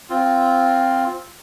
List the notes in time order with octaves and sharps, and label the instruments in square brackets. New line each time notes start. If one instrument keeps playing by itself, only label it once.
[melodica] C4 F4